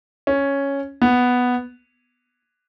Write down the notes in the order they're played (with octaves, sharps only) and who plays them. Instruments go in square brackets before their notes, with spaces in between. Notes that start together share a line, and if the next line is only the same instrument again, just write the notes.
[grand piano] C#4
B3